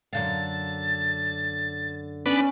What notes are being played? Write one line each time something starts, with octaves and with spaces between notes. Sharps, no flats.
F#2 D3 F5 A6
B3 C#4 D4 B4